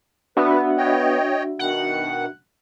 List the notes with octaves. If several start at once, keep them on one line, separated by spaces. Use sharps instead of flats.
B3 D4 F#4 B4 E5
C#5 D#5 G5
B2 D#3 F#5